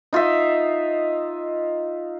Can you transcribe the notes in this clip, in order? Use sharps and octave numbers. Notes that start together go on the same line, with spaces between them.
D#4 F4 D#5 E5